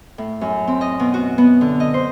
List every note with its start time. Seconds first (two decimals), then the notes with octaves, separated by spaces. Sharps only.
0.18 A2
0.41 F#2
0.67 C4
0.81 D#5
1.00 B2
1.14 F#4
1.38 B3
1.61 D3
1.80 D#5
1.94 C5